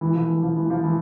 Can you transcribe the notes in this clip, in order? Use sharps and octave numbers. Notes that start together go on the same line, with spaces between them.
E3
F3
E3
F3
E3
F3
E3